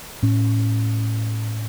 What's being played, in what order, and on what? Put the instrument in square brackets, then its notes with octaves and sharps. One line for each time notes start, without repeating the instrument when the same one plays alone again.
[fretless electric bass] A2 C#4